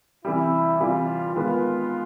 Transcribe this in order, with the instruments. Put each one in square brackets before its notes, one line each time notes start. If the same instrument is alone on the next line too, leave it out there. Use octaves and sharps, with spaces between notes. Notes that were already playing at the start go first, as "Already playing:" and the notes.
[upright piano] C3 E3 G3 [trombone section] E4
[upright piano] C3 E3 G3 [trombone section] F4
[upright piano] D#3 G#3 B3 [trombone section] F4